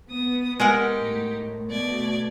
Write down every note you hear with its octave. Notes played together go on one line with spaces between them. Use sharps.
B3 D#6
G#3 D#4 G4 A#4 F#5
A2
B2 A3 D5 G#6